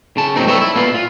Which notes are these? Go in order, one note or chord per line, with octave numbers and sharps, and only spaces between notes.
C#3 A5
A2 F#3 A#3 C4 D#4
G3 B3 A4 C#5 E5
E4
A#2 B3 F4
F4